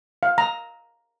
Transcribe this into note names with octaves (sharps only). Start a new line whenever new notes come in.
F5
A#5